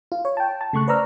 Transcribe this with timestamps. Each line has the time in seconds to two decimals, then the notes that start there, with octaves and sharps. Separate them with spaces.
0.12 F4
0.25 C#5
0.37 G5 A5
0.61 A5
0.73 C#3 A3 C#6 F#6
0.88 B4 C5 D5 A#5 E6 F6